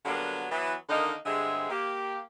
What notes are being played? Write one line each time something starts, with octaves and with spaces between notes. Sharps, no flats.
D3 F#3 G3 A#3 B3
E3 F#3 B3
D3 D#3 A#3 D#4
G2 D3 G#3 C4 G#4 E5
A#3 G4